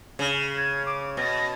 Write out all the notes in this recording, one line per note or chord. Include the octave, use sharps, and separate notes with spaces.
C#3
G#6
D6
B2 A#6